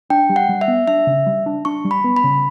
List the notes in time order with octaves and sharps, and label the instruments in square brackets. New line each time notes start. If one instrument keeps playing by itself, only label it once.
[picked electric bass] D4 [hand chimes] G5
[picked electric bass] G3
[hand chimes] F#5
[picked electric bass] G3
[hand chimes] E5
[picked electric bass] B3
[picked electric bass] D4 [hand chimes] E5
[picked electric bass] C#3
G3
D4
[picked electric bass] D4 [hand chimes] C#6
[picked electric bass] G3
[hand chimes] B5
[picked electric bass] B3
[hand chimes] B5
[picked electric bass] C#3